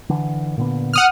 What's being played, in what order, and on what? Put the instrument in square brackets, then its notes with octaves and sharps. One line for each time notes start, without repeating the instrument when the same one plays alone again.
[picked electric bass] D3 E3
A#2 D3 B3
[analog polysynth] F#5 D#6 F6